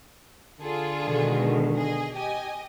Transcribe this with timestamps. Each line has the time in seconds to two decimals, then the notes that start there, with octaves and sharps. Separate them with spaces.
0.60 D3 F4 G#4 A4
1.05 B2 D#3 G#3
1.75 G#4 D#5
2.14 G4 D#5 G#5